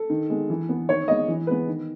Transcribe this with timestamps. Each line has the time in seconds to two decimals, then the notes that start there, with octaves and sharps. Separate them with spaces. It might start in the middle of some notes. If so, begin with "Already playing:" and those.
Already playing: A4
0.10 D#3
0.30 G#3 B3
0.50 E3
0.69 B3
0.88 D#3 C#5
1.08 G#3 B3 D#5
1.28 E3
1.47 G#3 B3 B4
1.68 D#3